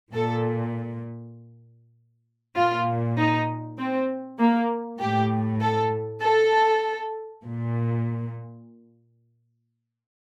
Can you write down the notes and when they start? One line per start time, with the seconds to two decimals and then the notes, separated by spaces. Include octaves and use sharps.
0.12 A#2 A4
2.56 A#2 F4
3.18 D#4
3.78 C4
4.39 A#3
5.00 A2 G4
5.60 A4
6.22 A4
7.44 A#2